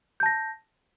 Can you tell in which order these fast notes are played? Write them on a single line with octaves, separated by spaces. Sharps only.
G6 A5 A#6